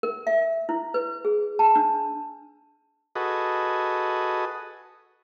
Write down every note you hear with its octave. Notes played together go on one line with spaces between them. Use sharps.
A#4
E5
E4
B4
G#4
A5
D4
F#4 G#4 A4 B4 D#5